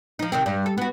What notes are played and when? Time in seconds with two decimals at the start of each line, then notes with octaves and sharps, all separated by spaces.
0.19 F3 D#4
0.32 C3 D#3 C4
0.46 G2
0.66 A4
0.78 B3 F#4